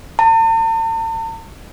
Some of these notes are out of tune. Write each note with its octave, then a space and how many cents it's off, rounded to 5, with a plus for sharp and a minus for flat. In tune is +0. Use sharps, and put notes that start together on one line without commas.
A5 +45